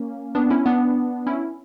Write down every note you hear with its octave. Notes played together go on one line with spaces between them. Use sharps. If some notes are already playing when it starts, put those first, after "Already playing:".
Already playing: A#3 C#4
B3 D4
C#4 E4
B3 D4
C#4 E4